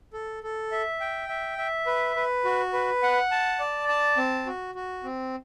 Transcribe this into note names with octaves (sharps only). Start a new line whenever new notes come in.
A4
A4
E5
G5
E5
E5
B4
B4
F#4
B4
F#5
A5
D5
A5
C4
F#4
F#4
C4